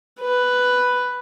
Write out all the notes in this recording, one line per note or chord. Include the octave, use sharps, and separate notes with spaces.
B4